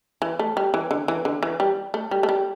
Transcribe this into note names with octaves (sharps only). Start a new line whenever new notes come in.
E3
A3
G3
E3
D3
E3
D3
E3
G3
A3
G3
A3
G3